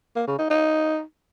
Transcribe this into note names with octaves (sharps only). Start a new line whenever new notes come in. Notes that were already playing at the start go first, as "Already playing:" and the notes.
A#3
C#3
D#4
D#4